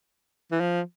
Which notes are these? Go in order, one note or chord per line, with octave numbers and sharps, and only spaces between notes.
E3
F3